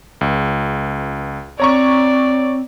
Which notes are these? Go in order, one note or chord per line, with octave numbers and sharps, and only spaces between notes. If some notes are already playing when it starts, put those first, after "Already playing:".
C#2
C4 C#5 D5 A#5 C#6